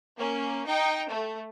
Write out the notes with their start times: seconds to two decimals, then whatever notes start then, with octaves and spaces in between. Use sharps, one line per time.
0.17 A#3 C#4
0.66 D#4 G5
1.09 A3